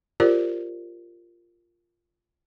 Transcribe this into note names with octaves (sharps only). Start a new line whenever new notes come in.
F4 G4 A#4 C5 D5